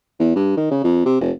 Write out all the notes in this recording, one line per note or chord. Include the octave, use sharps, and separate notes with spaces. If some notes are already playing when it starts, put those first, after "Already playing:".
E2
G2
D#3
C#3
F2
C3
F1